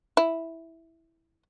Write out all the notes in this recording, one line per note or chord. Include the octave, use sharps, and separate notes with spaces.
E4